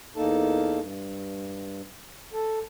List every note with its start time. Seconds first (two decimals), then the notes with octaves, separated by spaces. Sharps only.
0.16 E2 A#3 D#4 A4 A5
0.80 G2
2.33 A4